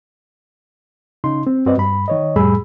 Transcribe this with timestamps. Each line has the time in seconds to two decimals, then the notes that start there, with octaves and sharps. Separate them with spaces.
1.24 C#3 D#4 C6
1.47 C4
1.66 G2 C4 F#4 B4 D5 D#5
1.78 G2 B5
2.08 D#3 C#5 D#5
2.36 F2 A2 G3 G#4 B5 E6